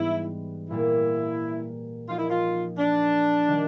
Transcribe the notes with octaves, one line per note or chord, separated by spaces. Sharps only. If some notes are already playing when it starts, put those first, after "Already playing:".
Already playing: G#2 E3 G3 B3 E4
A#2 G3 A#3 E4
F3 A#3 D#4 F4 G4 A#4
E4
F4
D4
D#3 G3 A#3